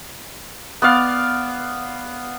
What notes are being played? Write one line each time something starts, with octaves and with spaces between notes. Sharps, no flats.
B3 D5 F5